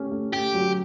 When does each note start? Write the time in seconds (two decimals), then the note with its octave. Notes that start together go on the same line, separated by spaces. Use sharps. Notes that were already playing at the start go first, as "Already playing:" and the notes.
Already playing: A3 C#4 G4
0.11 A3
0.33 A3 G4
0.54 F#3